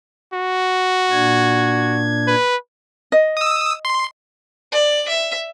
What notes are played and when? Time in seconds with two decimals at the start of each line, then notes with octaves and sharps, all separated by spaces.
0.33 F#4
1.11 A#2 D4 G#6
2.27 B4
3.12 D#5
3.37 D#6 E6
3.85 C6
4.72 D5
5.08 E5